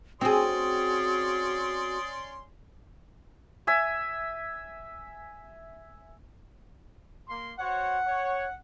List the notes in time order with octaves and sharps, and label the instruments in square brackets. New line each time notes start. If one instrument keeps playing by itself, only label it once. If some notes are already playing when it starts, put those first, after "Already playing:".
[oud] C4 G#4 [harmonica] C#4 D5 C6 [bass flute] F#4 [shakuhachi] D#6
[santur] E5 G#5
[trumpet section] A#3 C6
[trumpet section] F#4 C5 C#5 [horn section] F#5
[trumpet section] C#5